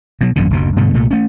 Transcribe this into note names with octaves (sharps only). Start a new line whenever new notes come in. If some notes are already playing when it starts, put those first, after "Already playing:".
B2 F#3
A1 F#2 A#2 D3
F#1 D2 B2
G2 B2 D3 A3
C2 A#2 A3
A3 C#4